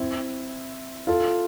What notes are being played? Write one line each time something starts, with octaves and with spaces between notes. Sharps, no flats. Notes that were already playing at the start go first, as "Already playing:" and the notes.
Already playing: C4 E4
F4 A4